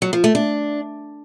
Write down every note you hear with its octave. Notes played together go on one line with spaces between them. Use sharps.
F#3
F3
A3
D4